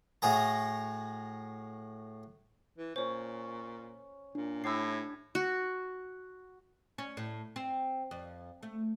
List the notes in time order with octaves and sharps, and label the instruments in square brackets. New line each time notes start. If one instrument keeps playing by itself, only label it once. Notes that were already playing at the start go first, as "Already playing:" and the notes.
[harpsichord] A2 F#4 G#4 A#5
[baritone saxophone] E3
[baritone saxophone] A#2 [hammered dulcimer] C#4 [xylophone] C5 C#5
[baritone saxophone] A#2 [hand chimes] D4
[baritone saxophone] A2 [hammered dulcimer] E4 G4 A5 [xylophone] E6 C7
[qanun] F#4
[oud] C#4
A2
C4
F2
A3